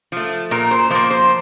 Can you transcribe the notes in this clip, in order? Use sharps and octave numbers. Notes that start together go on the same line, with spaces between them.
F3 A3
A#2 A#4
C5
F3 A#3 C5
C5